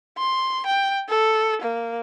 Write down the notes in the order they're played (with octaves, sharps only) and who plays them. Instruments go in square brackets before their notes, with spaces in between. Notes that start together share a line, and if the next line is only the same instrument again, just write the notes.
[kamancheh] C6
G5
A4
A#3